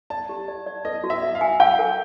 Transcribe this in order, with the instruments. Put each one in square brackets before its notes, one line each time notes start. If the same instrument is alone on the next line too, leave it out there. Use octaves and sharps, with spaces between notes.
[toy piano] D5 [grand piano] A5
[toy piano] G4
D5
D5
[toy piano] B4 [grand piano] D#5
[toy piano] F#4
[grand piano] E5
[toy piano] E5
[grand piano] F5
[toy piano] G#5
[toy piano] F5 [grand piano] G5
[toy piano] A#4